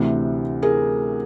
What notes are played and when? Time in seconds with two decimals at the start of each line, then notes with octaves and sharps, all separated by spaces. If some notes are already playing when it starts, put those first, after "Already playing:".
Already playing: D2 C3 E3
0.63 G#4 A#4